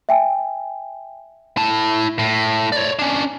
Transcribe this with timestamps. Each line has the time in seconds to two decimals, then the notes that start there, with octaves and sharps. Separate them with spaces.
0.09 E5 G5 G#5
1.57 E4 A5
2.19 A2
2.72 C#5 D5
2.99 C#4 D4